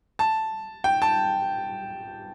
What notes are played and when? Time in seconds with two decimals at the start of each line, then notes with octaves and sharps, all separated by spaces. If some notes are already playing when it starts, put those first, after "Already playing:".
0.19 A5
0.84 G5
1.02 A5